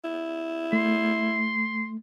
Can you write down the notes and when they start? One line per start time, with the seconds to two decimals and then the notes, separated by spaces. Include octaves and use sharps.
0.04 E4
0.73 A3 C6